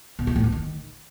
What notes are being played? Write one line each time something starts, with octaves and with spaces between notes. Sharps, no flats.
B2
F3
A2
E3
D#3